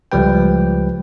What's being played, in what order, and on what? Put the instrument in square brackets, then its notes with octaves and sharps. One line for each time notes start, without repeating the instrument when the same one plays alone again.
[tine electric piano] C#2 F3 G3 B4 G5